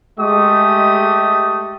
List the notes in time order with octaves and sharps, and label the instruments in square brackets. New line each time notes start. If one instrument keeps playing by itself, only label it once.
[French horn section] G#3 [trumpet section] A3 G4 D#6